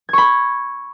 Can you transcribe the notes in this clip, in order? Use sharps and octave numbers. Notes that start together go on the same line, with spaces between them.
B5 C#6 G#6